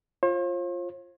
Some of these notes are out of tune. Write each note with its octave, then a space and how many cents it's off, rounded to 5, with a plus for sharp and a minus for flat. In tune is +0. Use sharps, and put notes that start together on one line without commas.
F4 +0 C5 +45